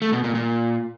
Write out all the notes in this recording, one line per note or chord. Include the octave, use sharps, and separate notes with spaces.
A3
B2
A#2
A#2